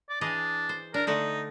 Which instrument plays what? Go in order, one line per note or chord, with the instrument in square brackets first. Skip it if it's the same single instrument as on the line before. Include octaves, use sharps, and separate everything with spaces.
[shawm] D5
[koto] E3 G#4 D#5 [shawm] D4
[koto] C5
[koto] D4 [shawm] A#4
[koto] D3 A3 F#5 [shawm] D#4